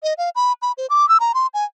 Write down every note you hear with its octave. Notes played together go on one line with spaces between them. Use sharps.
D#5
F5
B5
B5
C5
D6
E6
A#5
C6
G#5